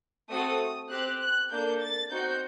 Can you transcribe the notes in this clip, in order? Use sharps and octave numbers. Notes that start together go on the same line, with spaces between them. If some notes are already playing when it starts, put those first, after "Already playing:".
A3 C4 F#4 A4 D#6
C4 G4 F#6
F#6
A#3 D4 A4 G6
A6
C4 D#4 F#4 G6